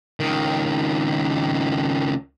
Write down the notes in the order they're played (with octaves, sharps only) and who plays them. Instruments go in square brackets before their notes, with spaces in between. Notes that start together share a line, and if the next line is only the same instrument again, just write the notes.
[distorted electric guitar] C#2 D#3